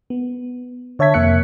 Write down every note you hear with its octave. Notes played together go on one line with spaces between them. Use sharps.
B3
D3 C#5 E5 A5 G#6 B6
F2 C3 A#3 E5 F#6 C#7